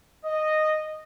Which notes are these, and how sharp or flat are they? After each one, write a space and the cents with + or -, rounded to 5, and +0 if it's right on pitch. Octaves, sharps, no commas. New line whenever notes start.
D#5 -10